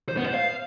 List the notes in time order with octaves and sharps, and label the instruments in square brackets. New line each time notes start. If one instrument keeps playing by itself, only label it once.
[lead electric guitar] C5
B3
C5
F5